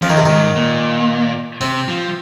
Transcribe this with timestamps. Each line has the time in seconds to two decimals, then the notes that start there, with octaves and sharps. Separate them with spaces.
0.02 F2 F3
0.10 D#3
0.17 C3
0.26 G#2 D#3
0.56 A#2
1.61 C3 C4
1.89 F3